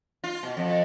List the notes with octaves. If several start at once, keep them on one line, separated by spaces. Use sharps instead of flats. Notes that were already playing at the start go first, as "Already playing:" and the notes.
F4
B2
F2